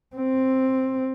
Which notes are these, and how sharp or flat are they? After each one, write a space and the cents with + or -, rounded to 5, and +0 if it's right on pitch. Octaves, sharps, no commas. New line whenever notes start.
C4 +5